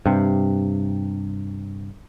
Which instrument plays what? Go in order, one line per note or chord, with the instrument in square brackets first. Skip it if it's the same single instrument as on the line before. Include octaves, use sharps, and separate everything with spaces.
[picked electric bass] G2 C3